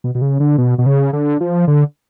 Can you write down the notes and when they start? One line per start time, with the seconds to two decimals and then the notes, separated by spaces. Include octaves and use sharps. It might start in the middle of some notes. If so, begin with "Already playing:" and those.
0.04 B2
0.15 B2
0.22 C#3
0.40 D3
0.58 B2
0.78 B2
0.86 C#3
1.13 D3
1.41 F3
1.67 D3